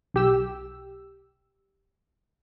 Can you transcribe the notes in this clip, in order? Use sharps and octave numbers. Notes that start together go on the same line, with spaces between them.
B1 G4 E6